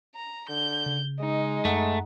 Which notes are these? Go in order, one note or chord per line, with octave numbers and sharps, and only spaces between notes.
A#5
D3 G6
C#3
G#3 D#4
F#2 A3 F#5 A#5